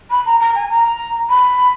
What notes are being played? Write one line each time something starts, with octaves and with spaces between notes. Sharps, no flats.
B5
A#5
A#5
G#5
A#5
B5